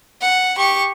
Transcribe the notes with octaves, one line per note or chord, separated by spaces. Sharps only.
F#5
G4 C#6